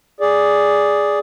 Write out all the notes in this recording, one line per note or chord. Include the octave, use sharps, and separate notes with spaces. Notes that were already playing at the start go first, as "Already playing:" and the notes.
G#4 D5